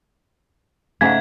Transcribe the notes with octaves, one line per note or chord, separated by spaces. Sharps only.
G#2 C#3 G#3 A3 F5 F#5 G#6